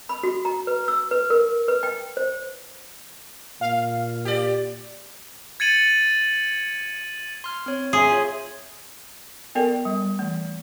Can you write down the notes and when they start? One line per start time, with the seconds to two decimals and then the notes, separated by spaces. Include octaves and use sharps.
0.09 B5
0.23 F#4
0.45 A#5
0.67 B4
0.88 E6
1.11 B4
1.30 A#4
1.68 B4
1.83 G5
2.17 C5
3.61 A#2 F5
4.25 G4 D5
5.60 G#6 A6 C#7 D#7 F#7
7.44 C6 F6
7.66 C4 C#5
7.93 G#4 E5 G#5 C6
8.11 F4 C#5
9.55 B3 A4 A#4 D5 G5
9.85 G3
10.19 E3 A3